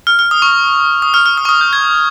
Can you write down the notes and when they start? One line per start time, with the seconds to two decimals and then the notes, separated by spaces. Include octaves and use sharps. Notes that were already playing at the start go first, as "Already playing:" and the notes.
0.07 F6
0.19 F6
0.31 D#6
0.42 C#6
1.02 D#6
1.14 F6
1.26 F6
1.38 D#6
1.45 C#6
1.49 D#6
1.61 G6
1.73 G#6